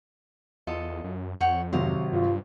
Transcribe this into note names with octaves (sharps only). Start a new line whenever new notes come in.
E2 F4 A4 D#5
F#2
F2 C#5 F#5 G5
G#1 C3 F#3 C5 F5
G2 F4